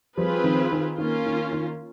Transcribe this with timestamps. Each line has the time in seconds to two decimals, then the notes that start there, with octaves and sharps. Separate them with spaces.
0.17 F3 G3 C4 F4 G#4 B4
0.44 D#3 F3
0.72 D#3
0.98 D#3 A#3 C#4 F4
1.26 D#3
1.53 D#3